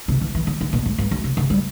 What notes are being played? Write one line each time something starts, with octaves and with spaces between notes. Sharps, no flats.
C3
E3
E3
D3
D3
A#2
G#2
G2
F#2
C3
C#3
G3